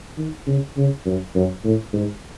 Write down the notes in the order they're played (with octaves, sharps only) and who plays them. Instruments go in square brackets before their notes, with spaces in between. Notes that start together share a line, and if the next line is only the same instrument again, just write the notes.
[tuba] D#3
C#3
C#3
F#2
F#2
A2
G#2